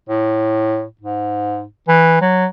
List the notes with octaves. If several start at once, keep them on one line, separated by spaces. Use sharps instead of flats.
A2
G#2
E3
F#3